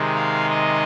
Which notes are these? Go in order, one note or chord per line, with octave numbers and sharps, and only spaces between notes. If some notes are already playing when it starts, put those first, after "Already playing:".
Already playing: C3 D#3 G#3 D#4
F5
D#5